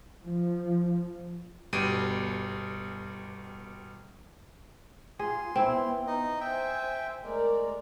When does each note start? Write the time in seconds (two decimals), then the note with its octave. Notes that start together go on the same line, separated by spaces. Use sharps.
0.24 F3
1.73 G1 B2 G3 D7 D#7
5.19 F4 G#4 C6
5.56 B3 C4 E4
6.07 D#4 D#5
6.41 C5 E5 G5 G#5
7.23 G#3 A3 A#4 D5